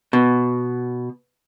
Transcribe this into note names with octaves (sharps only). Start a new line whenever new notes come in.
B2